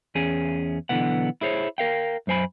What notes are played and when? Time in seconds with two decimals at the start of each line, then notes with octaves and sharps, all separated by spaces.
0.15 E2 C#4 G#4
0.89 B1 B2 D3 E3 B3 F#5
1.41 E4 G#4 C5 C#5
1.78 A#4 F5 G5
2.27 F#2 F#3 C5 G#5 B5